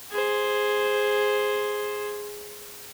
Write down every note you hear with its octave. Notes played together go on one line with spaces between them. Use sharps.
G#4 C5